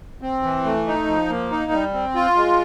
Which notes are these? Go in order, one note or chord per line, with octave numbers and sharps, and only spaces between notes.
C4
E3
A3
D#4
F3
A#3
D#4
G3
C4
F4
G#3